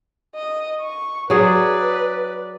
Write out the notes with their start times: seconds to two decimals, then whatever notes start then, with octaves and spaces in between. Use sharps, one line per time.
0.35 D#5
0.81 C#6
1.30 F#3 G#4 B4 D5